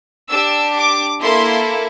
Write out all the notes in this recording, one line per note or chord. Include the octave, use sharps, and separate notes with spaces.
D4 G4 E6
D6
A#3 E4 A4 C6